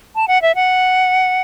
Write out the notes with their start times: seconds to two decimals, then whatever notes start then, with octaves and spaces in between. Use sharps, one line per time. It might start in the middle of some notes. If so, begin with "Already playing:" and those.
0.15 A5
0.28 F#5
0.42 E5
0.55 F#5